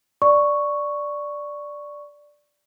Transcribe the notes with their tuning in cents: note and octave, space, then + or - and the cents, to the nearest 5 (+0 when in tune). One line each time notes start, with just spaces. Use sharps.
D5 +0 C#6 +0